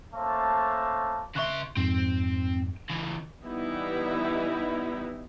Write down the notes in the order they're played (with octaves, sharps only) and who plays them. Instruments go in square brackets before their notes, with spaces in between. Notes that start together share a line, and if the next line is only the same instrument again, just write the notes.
[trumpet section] A3 A#3 C#4 C5 E5 A5
[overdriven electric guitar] C#3 C6 [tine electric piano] E5 C#6 F#6
[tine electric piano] F2 G#2 [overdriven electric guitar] C4
[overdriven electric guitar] C#3 E3
[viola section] E3 G3 B3 D#4 E4